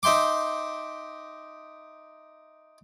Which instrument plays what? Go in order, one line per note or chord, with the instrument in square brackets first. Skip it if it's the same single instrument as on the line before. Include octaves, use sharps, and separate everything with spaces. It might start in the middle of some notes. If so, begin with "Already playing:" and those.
[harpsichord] D#4 E5 G5 C6 D6